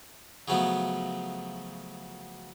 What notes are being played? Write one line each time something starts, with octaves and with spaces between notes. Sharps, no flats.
C#3 F3 F#3 A3 B3